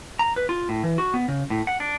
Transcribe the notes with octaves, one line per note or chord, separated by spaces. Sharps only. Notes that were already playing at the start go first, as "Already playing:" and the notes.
A#5
B4
F4
A2
E3
F#4
B3
C#3
A2
F#5
D4